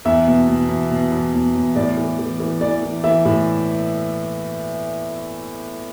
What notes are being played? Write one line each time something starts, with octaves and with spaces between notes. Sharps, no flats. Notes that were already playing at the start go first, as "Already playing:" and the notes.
E2 E5
B2
B2
E2
B2
E2
E2
E2
A2 D5
E3
E3
E3
E3 D5
E3
E3 E5
A2